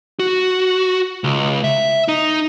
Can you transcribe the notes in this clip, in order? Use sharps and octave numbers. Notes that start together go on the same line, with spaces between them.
F#4
C#2
E5
D#4